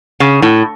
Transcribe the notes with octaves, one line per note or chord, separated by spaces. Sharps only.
C#3
A2